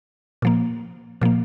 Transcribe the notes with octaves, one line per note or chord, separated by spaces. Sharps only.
A#2 F3 A#3
A#2 F3 A#3